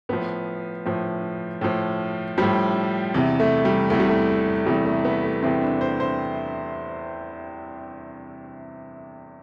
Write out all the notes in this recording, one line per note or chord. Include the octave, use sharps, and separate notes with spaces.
A2 F3 B3
A2 F3
A2 F3
A2 F3 G3
E2 C3 E3
A3
G3
E2 C3 E3 A3
G3
A3
E2 C3 E3 G3
A3
B3
A3
E2 C3 E3 C4
D4
C5
C5